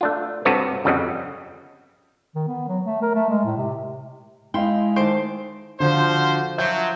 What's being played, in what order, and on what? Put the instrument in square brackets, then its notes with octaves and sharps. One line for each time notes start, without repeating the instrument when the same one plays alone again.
[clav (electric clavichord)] A3 D4 F4
G2 C3 F#4 A4 B4 C#5
G1 F2 C#3 G3 D#5 F#5
[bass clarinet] D#3
B3
F#3
A3
A#4
A3
G#3
A2
C3
[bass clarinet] G#3 [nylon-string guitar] E4 [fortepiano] D#5 F5 G5 [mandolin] C6
[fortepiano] D#3 A3 [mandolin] C5 C6 D6
[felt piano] D3 [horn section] F3 F#4 C5
[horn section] F3 F#3 [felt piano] E5 G6